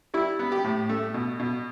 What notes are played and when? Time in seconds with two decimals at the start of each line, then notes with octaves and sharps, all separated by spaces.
0.14 G3 E4
0.39 B3
0.52 G4
0.64 A2
0.89 A3
1.14 B2
1.39 B2